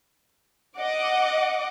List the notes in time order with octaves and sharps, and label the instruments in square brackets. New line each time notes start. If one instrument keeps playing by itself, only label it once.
[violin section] D#5 F#5 D6